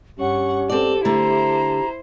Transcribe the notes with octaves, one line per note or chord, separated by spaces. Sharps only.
G2 C#4 G4 F#5 C#6
C4 A4 D5
D3 A3 E4 C5 A#5